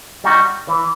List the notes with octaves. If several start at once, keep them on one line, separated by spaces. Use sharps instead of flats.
G3 D#4 F#4
E3